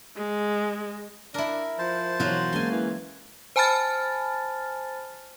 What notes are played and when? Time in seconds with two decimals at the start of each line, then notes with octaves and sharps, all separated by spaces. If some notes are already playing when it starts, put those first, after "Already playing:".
0.16 G#3
1.34 D4 E4 A#4
1.79 F3 C5 A5
2.20 B2 E3 F#3 F4 F#4 C#5
2.53 G#3 A#3 C#4 G#5 C6
2.72 E3
3.56 C5 G#5 A5 B5 F6 A6